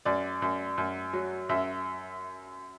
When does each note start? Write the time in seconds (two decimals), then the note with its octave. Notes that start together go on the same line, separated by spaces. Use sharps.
0.05 F#2 D5
0.42 F#2
0.78 F#2
1.13 F#3
1.49 F#2 E5